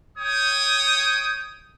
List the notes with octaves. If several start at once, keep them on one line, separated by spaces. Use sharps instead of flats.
C#5 G5 D#6